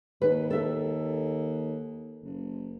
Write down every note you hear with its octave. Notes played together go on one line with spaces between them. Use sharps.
D#2 B4
A4 E5
F#1